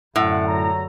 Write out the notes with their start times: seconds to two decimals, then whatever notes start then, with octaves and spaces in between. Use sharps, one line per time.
0.16 F#2 A2 D3 E5 F#5
0.47 C#2 F#3 A#5